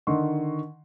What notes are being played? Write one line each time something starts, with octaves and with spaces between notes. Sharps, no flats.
D3 D#3 D#5 C6 C#6